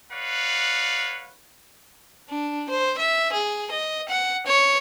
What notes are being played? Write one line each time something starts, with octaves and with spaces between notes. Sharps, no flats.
B4 C#5 D5 F5 F#5
D4
C5
E5
G#4
D#5
F#5
C#5